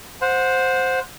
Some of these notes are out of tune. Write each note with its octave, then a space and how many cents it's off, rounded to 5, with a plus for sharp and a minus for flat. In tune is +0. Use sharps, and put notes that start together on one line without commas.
C5 +0 F#5 -25